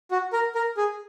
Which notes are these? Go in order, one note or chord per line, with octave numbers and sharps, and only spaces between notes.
F#4
A#4
A#4
G#4